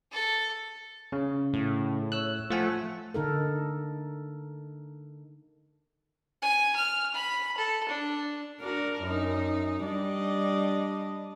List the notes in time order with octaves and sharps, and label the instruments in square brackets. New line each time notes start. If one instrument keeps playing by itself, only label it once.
[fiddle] A4
[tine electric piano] C#3
[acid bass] A2
[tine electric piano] C#5 E6 F#6
[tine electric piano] F3 F#5 G#5 [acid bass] A3
[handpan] D3 D#4 A4 A#4
[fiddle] G#5
F6
B5
A4
D4
[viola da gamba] D4 F#4 A#4
F#2 D#4
G3 D4 D#5